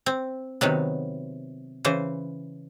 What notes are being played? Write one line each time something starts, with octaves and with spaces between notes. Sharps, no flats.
C4
C3 D#3 F#3 B3
C#3 E3 C5